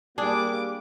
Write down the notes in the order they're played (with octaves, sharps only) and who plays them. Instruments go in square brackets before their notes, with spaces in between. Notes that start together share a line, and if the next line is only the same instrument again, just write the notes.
[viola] G3 D6 [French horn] A#3 [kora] D4 G#4